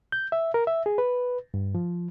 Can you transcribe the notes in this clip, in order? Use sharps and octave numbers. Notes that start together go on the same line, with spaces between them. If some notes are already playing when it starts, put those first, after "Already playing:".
G6
E5
A#4
E5
G#4
B4
G2
F3